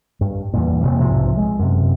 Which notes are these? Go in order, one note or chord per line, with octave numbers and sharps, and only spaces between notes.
G2
E2 G2 A#2
E1 B1 C3 A#3
B1 G#2 C3 F3
G#3
F#2 C3